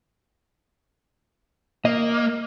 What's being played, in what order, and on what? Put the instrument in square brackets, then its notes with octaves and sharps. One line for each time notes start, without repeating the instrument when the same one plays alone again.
[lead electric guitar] A#3 [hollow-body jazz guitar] D#5